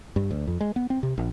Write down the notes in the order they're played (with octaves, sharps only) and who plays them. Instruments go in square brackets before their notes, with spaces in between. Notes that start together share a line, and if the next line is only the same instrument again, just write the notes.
[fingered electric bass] G2
D2
F2
G#3
B3
C4
C3
A#1